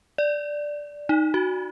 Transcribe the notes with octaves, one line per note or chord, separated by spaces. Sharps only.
D5
D#4
F#4